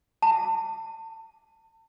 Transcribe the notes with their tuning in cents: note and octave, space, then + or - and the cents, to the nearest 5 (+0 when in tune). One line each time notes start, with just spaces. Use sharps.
A5 +35